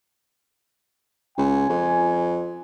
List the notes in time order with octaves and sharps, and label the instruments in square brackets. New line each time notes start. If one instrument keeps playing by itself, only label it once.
[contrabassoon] C#2 [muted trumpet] G#5
[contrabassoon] F2